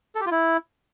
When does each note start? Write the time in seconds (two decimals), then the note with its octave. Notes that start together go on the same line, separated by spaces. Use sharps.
0.15 A4
0.21 G4
0.26 F4
0.32 E4